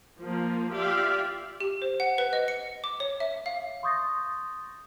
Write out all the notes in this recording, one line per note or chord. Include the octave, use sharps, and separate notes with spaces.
F3 A#3
F4 G4 D5 E5 F5
G4
C5
F#5
B4
D#5
C#7
D6
C#5
E5
F5
C6 C#6 D#6 G6 A6 A#6